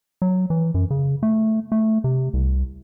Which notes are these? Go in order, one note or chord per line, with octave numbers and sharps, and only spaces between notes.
F#3
E3
F#2
C#3
A3
A3
C3
C2